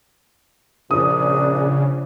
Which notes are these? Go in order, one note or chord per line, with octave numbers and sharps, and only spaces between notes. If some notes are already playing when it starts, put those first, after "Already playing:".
A#1 C#3 D4 D#6